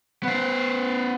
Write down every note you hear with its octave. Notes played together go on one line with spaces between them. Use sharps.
B3 C5